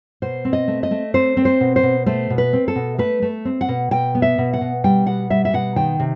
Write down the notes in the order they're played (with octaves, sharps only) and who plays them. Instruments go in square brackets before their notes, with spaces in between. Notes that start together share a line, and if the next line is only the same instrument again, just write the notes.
[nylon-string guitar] B2 C5
C4
D#5
A3
D#5
A3
C4 C5
C4
C5
B2
C5
B2
A3 C5
B2
B4
C4
A4
B2
A3 B4
A3
C4
F#5
B2
B2 G5
B3
E5
B2
F#5
B2
G3 G5
B2 F#5
G3 E5
E5
B2 F#5
D#3 G5
C3